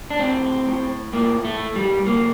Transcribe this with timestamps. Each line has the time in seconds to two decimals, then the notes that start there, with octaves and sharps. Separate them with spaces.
0.10 D4
0.19 A2 C4
0.67 A2
1.13 A2 A#3
1.45 A3
1.60 A2
1.76 G3
2.06 F#2 A#3